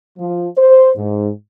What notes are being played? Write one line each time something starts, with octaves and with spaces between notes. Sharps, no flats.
F3
C5
G#2